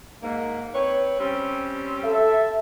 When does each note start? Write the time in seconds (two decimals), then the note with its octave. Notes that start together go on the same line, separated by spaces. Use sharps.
0.21 G#2 A#3
0.74 C4 B4 C#5
1.18 G3 C4 C#4
2.04 A4 E5